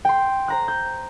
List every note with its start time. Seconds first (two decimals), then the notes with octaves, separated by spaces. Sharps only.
0.05 G5 C6
0.48 C5 A#5 F#6
0.68 G6